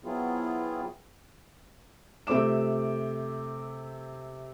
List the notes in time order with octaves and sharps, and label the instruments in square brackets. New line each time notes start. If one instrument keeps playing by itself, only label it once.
[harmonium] F#3 B3 C4 E4 F4 G#4
[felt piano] C3 A3 C4 F4 D6 E7